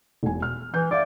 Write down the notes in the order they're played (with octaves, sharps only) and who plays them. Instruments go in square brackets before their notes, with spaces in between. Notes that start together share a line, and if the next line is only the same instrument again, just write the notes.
[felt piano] E1 G#5
F6
[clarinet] E3 [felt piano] G6
[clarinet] D5 [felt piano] E5 F5 D6